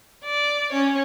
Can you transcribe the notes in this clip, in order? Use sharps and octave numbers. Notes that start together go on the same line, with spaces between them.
D5
C#4 C#5